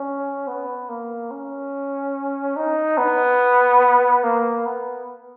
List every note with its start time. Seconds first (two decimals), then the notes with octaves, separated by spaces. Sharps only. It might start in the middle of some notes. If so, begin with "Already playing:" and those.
Already playing: C#4
0.48 B3
0.89 A#3
1.31 C#4
2.56 D#4
2.98 B3
4.24 A#3
4.66 B3